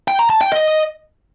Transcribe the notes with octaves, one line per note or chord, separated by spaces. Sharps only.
G5
A#5
A5
G5
D#5